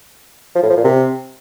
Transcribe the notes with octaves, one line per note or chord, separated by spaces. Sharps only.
F3
A2
F3
A#2
C3